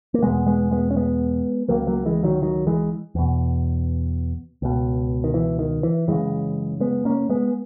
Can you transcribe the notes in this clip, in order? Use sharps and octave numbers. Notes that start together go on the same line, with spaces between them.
A#3
E2 B2 G#3 B3
G#3 B3
G#3 B3
C#4
G#3 B3
C#2 C#3 F#3 A#3
F#3 A#3
E3 G#3
D#3 F#3
D#3 F#3
E3 G#3
E2 B2
C#2 B2
D#3
E3
D#3
E3
F#2 C#3 E3 G#3
G#3 B3
A#3 C#4
G#3 B3